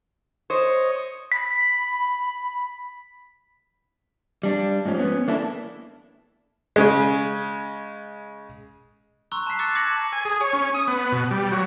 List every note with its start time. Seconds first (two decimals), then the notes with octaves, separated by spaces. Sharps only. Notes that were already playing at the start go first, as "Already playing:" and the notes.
0.50 C5 C#5 D#5
1.32 B5 B6
4.43 G3 D4
4.85 G#2 F3 C#4
4.99 B3 C#4
5.28 A#3 D4 E4 A4
6.76 C#3 G#3
9.32 A#5 C6 C#6 E6 F#6
9.47 A5 A#5 F#6 B6 C7
9.59 C#6 D6 E6 F#6 A6 C#7
9.75 A5 D6 G#6 A#6 C#7 F#7
10.13 G#5
10.25 G#4
10.41 C#5
10.53 C#4
10.75 D#6
10.88 B3
11.12 B2
11.31 G3
11.52 F#3